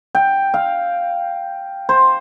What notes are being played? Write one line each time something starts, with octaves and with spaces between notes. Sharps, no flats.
G5
F5
C5